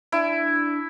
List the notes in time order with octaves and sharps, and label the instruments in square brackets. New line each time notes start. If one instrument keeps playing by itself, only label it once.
[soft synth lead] D4 [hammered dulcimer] E4